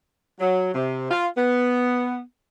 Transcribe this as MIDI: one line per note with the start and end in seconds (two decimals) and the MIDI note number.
0.40 0.72 54
0.74 1.10 48
1.11 1.27 65
1.37 2.21 59